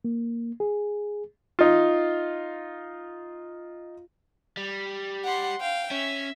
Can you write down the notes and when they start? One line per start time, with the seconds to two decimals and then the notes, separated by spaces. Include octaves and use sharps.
0.05 A#3
0.60 G#4
1.59 D#4 F4
4.57 G3
5.25 F#5 C6
5.60 F5 G5
5.91 C#4 E5